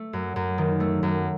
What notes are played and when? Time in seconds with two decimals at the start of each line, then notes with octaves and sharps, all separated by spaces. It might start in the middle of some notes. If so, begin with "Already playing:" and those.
Already playing: A3
0.13 F#2
0.36 F#2
0.58 D#3
0.80 A3
1.03 F#2